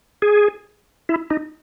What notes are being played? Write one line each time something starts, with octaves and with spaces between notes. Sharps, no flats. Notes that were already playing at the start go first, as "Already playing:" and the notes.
G#4
E4
D#4